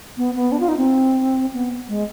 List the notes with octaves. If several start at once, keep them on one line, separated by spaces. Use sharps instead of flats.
B3
B3
D4
F4
D#4
C4
B3
G#3